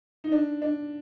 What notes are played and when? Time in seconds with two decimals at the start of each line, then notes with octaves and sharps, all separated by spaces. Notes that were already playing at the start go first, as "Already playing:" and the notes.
0.24 D#4
0.32 D4
0.62 D4